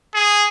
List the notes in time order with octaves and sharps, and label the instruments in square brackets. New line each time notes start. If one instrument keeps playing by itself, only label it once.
[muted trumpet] G#4